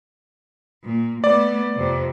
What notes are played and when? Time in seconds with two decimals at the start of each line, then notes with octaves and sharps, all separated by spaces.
0.84 A#2
1.24 A3 B3 D5
1.74 F2 C3